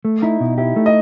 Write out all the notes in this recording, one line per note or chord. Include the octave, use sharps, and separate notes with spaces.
A3
D#4 E4
B2
E4 G4
A3
D#5